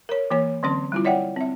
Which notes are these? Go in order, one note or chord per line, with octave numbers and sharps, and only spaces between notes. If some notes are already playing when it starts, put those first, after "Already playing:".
A#4 C#5
E3 A#3 C#5
D3 F#3 C4 C#4 C6
G3 E4 F4
C#5 D5 E5 F#5 G5
C4 E5